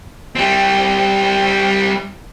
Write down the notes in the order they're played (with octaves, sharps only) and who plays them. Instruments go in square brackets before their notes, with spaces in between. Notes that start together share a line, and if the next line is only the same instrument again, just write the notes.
[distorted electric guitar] G3 C4